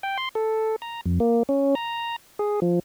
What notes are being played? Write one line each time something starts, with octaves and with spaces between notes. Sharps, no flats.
G5
C6
A4
A#5
F2
A#3
C#4
A#5
G#4
F3